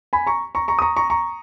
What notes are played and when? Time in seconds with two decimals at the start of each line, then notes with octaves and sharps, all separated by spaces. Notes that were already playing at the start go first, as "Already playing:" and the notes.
0.13 G#5 B5
0.26 A#5 C#6
0.55 A#5 C#6
0.68 A#5 C#6
0.79 D#6
0.82 A#5 C#6
0.97 A#5 C#6
1.10 A#5 C#6